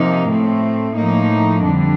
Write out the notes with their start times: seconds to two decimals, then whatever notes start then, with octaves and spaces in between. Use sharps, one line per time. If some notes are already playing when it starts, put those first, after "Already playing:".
Already playing: C3 F3 A#3 D#4
0.29 A2 A3 C4
0.96 A2 F3 A#3 D#4
1.63 F2 D3 G3 D4